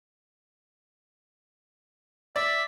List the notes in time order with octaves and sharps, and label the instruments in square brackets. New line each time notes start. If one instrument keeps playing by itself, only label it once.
[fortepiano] D5 [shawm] E5